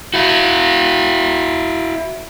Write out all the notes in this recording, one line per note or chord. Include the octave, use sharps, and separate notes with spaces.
E4 F#4